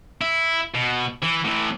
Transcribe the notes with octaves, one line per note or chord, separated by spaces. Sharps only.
E4
B2
E3
A2 E3